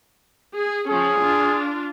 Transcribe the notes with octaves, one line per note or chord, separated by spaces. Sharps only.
G#4
F3 C#4 G#4
D4 F4